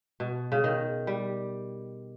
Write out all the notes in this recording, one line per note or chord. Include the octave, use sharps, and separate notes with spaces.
B2
C#3
D#3
G3